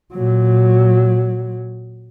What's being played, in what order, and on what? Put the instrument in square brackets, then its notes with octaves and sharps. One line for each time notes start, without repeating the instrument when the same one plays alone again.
[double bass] A#2 F#3